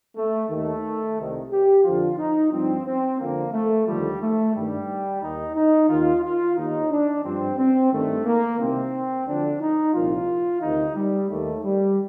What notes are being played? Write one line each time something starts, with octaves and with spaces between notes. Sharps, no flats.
A3
D#2 D#3 A3
C2 C3 D#3
G4
F2 D3 F3 F4
D#4
G2 F3 C4
C4
F2 D3 F3 A#3
A3
D#2 D3 F3 G3
A3
G2 D#3 G3
D#2 D#3 D#4
D#4
D#2 D#3 F4
F4
D#2 D#3 D#4
D4
G2 F3 C4
C4
G2 D#3 A3
A#3
C2 C3 D#3 C4
D2 D3 F3 D4
D#4
C2 A#2 F3 F4
D2 C3 D#3 D#4
G3
D#2 D#3 A3
G3